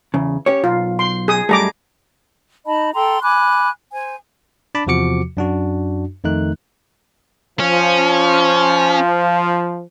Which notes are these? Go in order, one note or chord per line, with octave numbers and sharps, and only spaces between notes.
E2 C#3
C#4 G4 C#5
B1 F4
C6
G#4 D#6
F#2 G3 A3 G#4 A#5 D6
D#4 D#5 A5 B5
A4 G5 A#5 C6
G#5 B5 D6 F#6
C5 G#5
D4 A5 B5 D6
E2 C3 F3 F#4 D6 C#7
F#2 D4 F#4
F2 D#3 A3 D#4 F#6
F3 C#4